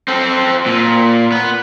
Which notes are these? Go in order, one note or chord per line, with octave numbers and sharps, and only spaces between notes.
C4 A4
A#2
B3